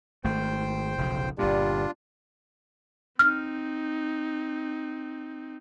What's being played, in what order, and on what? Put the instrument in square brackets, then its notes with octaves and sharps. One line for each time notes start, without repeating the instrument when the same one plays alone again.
[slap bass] G#1 A3 [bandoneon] C5 G5
[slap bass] F1 B1 C#3
[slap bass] G1 A#2 [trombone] G3 [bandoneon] D4 F4
[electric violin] C4 D#4 [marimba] F6